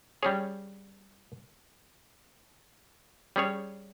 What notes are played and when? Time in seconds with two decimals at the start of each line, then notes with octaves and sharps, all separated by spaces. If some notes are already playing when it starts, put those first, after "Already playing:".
0.23 G3 C#4 G#4 C#5
3.36 G3 C#4 G#4 C#5